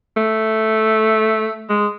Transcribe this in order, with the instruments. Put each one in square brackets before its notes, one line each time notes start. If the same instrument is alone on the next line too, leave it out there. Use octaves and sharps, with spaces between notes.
[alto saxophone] A3
G#3